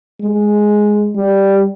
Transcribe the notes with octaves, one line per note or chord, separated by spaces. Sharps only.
G#3
G3